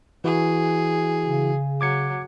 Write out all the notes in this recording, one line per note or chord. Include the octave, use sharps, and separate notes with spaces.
E3 E4 F#4 G#4
C#3
F#3 D6 G#6 C#7